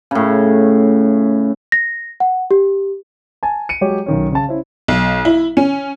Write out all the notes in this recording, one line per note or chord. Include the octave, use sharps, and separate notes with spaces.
A2 C#3
A#6
F#5
G4
G#5 A5
C#7 D#7
F#3 G#3 G4 C#5
B1 D#3 C#4
C#3 A5
C#4 E4 C5
B1
E4
C#4